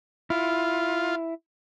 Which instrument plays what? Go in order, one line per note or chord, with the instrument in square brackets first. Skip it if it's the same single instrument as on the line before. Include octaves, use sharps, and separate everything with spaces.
[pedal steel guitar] E4 [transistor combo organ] F4